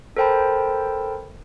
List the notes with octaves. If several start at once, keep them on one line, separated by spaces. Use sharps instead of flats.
A4 A#4 C5 G5 A5 B5